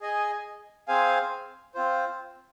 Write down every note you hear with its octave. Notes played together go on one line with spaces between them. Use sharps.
G#4 D#5 G#5
C4 G#4 C5 F5 G#5
C4 F4 C5